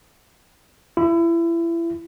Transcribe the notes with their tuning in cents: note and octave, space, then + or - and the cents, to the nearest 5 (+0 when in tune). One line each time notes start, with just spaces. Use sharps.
E4 +30